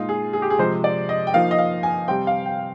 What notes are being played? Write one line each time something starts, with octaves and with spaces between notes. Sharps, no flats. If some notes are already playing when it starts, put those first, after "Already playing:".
Already playing: A#2 G#3 D#4 F4
G#4
G#4
G4
G#4
C3 F3 G#3 C5
D5
D#5
G5
F3 A#3 D#4 F5
D#5
F5
G#5
C3 G3 C4 G5
F5
G5